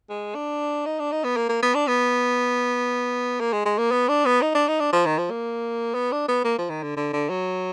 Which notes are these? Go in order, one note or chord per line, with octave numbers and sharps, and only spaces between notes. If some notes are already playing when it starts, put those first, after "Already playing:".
G#3
D4
D#4
D4
D#4
B3
A#3
A#3
B3
D4
B3
A#3
G#3
G#3
A#3
B3
D4
B3
D#4
D4
D#4
D4
F3
D#3
F3
A#3
B3
D4
B3
A#3
F3
D#3
D3
D3
D3
F#3